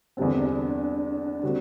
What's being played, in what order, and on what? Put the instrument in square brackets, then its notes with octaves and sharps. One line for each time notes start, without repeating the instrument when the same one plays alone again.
[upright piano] E2 D3 G3 C4 [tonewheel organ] D4
[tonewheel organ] D4
[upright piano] D3 G3 C4 F#4